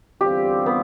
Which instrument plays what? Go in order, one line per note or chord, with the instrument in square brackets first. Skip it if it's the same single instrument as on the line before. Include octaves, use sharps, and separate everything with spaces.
[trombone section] E2 D3 G3 C4 F4 [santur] G4
[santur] B3